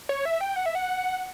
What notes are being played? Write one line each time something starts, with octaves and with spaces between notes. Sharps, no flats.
C#5
E5
G5
F#5
E5
F#5